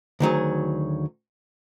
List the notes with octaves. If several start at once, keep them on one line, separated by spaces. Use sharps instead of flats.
D2 D#3 F#3 G#4